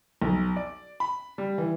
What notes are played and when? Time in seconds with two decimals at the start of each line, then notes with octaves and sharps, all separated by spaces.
0.22 B1
0.56 D5
1.00 B5
1.38 G3
1.58 E3